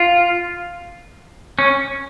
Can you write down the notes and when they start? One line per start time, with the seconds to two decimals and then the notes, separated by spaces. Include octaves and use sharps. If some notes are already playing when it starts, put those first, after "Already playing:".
Already playing: F4
1.59 C#4